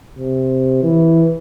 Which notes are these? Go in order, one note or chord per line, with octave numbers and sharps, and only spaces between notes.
C3
E3